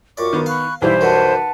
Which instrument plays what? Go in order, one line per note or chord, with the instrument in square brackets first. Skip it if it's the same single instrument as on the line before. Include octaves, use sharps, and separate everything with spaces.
[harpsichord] F#2 D5 [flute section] F4 C#6 D6
[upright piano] D#3 B3
[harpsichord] F5 [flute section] B5 C#6 F#6
[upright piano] B1 E3 G3 [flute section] E4 E5 F5 [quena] C5
[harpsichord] F#2 B2 D3 [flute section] B4 F#5 A5